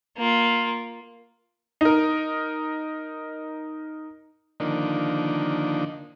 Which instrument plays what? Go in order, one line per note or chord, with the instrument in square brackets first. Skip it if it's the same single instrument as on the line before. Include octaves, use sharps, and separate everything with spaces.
[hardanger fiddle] A#3 F4
[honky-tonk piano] D#4 A#4
[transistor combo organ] D3 D#3 F3 A#3 D4 D#4